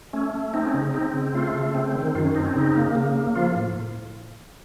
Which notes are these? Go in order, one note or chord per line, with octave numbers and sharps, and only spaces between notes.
A3 C#4
A3
C4 D#4
C#4
C#3 D#4
C4 D#4
C#3
A3 F4
C#3
C4
D#3
F#2 F4
C#4
C4 D#4
C#4
C#3 D#4
A#3
C#3
A#3
F3 F4
A2